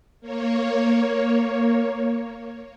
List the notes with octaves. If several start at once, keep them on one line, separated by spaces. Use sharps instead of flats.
A#3 C#5